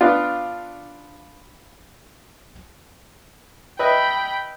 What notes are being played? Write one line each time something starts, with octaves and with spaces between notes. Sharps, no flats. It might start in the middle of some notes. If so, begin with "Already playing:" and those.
B3 D4 F4
B4 D#5 E5 G5 B5